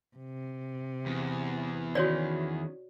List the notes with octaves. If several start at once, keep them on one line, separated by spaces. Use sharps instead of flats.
C3
E2
D#3 C#4 F#4 C#5 D5